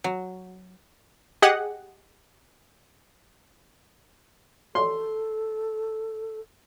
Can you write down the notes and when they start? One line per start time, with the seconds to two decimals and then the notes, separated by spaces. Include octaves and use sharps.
0.04 F#3
1.42 G4 G#4 D#5 F#5
4.75 A4 C6